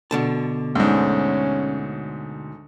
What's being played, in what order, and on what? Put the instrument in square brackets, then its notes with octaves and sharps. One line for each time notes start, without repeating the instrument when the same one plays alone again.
[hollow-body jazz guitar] B2 D3 A5
[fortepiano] D2 G#2 [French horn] C#4